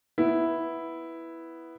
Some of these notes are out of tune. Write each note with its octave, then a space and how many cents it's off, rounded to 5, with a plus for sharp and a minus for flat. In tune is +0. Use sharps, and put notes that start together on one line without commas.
B3 +0 E4 +0